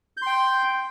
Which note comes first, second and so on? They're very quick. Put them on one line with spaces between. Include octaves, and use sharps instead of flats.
G6 C6 G5